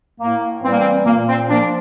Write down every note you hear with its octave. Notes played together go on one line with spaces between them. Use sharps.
A2 A#3
E3 G3 A#3 C4
C4
A#2 A#3
C4
F3 A#3 D4